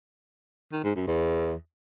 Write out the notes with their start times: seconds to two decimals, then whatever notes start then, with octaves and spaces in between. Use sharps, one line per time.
0.73 D#3
0.84 G#2
0.96 F#2
1.07 E2